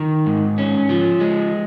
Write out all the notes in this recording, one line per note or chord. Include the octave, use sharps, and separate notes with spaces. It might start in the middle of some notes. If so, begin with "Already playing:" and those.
Already playing: D#3
G#2
C#4
F3
G#3